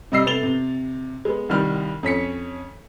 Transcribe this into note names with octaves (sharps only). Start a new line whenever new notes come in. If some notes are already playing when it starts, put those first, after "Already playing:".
C3 G3 D#5 E6 C7
C3 A3 B3 A6 F7 G7
C3
G#3 B3
C2 D#3 G3 F6
F2 C#4 B6 C#7